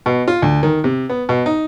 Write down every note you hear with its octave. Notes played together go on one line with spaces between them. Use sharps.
B2
F4
D2
D#3
C3
B3
B2
D#4